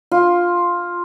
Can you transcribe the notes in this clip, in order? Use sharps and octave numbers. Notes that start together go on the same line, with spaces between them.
F4